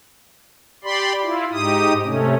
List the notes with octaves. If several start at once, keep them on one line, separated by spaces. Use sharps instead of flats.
G4 D5 B5 C6
E4 F4
G#2 D#4 G4 D#6
C3 A3 C#4